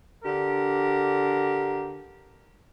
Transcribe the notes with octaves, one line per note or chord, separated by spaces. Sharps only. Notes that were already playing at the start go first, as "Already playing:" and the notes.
D3 D4 G4 A#4